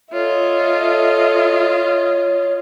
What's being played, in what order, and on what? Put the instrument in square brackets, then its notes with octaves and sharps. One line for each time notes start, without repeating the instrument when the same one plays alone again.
[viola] F4 D#5 [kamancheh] A4 E5 [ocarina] C#5